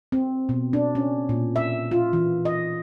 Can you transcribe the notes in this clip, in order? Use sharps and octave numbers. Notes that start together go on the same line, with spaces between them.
C4
B2
D4
C#4
A#2
E5
F4
E3
D#5